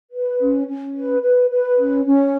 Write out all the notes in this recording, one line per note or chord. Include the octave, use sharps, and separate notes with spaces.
B4
C#4
C#4
B4
B4
B4
C#4
C#4